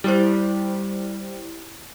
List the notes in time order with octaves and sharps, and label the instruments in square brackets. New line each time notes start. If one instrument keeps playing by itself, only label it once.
[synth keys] G3 [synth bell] E4 G4 C5